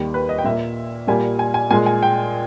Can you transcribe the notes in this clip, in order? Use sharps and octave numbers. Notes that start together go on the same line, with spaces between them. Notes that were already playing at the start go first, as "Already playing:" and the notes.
Already playing: D#2 D#3 G3 A#3
B4
D#5
G5
A#2 A#3 E5
A#2 G3 A#3 G#5
G#5
G#5
A#2 G#3 G#5
G#5
G5